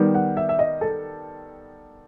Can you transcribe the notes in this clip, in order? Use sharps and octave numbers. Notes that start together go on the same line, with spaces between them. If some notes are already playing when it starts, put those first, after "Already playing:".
Already playing: D#3 G3 B3
F#5
E5
E5
D#5
A4